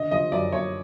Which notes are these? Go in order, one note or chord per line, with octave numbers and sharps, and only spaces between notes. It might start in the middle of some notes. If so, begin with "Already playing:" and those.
Already playing: D3 D#5
F3 D#5
F#2 D5
F#2 C#5